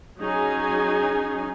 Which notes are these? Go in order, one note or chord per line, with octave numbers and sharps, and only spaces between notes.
F#3 C#4 D#4 G#4 G#5